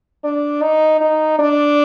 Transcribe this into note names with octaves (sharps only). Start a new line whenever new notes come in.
D4
D#4
D#4
D4